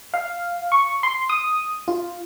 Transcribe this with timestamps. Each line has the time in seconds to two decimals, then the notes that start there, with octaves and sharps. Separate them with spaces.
0.14 F5
0.72 C#6
1.03 C6
1.30 D#6
1.88 F4